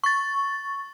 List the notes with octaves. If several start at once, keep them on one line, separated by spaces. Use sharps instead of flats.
C#6 A6